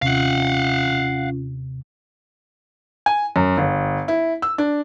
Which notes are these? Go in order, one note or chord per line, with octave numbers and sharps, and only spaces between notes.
D#2 C3 C#4 F4 F5 F#5
G#5
F#2
G1
E4
E6
D4